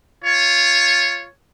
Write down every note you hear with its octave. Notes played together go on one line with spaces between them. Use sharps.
F4 C#5